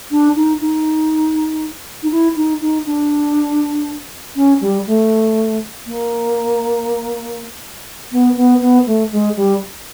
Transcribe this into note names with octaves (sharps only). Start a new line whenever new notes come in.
D4
D#4
D#4
D#4
E4
D#4
D#4
D4
C#4
G3
A3
A#3
B3
B3
B3
A3
G#3
G3